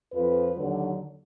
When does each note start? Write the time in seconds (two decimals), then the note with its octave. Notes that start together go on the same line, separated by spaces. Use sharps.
0.13 F2 F3 B4
0.56 D#2 D3 F#3